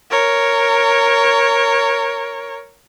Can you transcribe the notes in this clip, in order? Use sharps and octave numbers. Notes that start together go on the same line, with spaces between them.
A#4 C#5